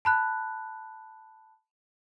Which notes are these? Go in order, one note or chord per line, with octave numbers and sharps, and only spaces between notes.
A5 B5 F#6